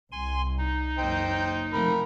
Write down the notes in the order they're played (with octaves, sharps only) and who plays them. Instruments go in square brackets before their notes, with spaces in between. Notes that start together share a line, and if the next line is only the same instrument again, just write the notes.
[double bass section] C2 [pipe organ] G#5 C6
[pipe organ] D#4
[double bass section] F#1 [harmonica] C5 D#5 G5
[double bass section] C3 F3 A3 [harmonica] A#4 B5